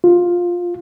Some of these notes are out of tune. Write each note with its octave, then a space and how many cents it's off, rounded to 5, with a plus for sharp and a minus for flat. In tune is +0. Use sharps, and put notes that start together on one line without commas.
F4 +10